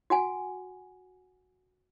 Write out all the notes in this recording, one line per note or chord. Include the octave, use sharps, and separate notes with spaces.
F#4 F#5 G#5